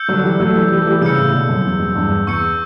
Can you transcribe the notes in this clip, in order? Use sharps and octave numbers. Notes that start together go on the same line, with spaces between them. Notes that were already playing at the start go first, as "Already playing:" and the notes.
Already playing: E6 G6 C#7
D3 F#3
E3 G3
F#3 A3
E3 G3
E3 G3
A3
E3 G3
C#3 E3 E6 G6 C#7
A2 C#3
B2 D3
F#2
E2
F#2
E2 G2
E2 C#6 E6 G6 C#7